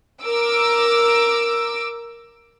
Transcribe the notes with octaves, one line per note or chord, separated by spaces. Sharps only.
A#4 D6 E6 D7